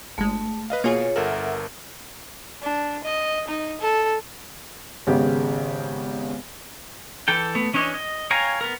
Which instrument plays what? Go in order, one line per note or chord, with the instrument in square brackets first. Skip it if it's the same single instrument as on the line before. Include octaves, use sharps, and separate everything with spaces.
[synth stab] G1 G#3 [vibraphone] A3
[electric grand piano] B4 D#5 F5
[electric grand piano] B2 [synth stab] A#3 F4 G#4 [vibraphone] C#5
[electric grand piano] G1 A4 A#4 [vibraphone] E5 F#5
[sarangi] D4
D#5
D#4
A4
[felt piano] G#1 C#3 B3 G4
[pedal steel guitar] E3 A4 G5
A3 B3
E3 C#4 D4 C#5 D#5
D#5
C#5 F5 G5 G#5 A#5
B3 A#4